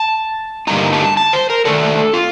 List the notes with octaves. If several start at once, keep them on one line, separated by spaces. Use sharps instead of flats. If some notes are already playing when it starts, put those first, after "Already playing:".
Already playing: A5
G2 D3 G3 A#3 D#4 A#5
A5
A5
C5
A#4
D#3 A3 D4 A4
F4